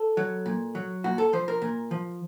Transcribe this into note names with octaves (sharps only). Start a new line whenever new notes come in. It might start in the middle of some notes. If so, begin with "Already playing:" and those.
Already playing: A4
F#3
A#2
F#3
A#2 F#4
A4
F3 C5
A#4
A#2
F3